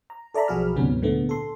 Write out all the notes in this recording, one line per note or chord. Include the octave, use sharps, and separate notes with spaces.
A#5
A4 D5 E5 A#5 B5
B1 F3 F#4 G#4 B5 F6
D2 G#2 C3 F#3 B3 C#4
A#2 D3 A3 B3
A4 C6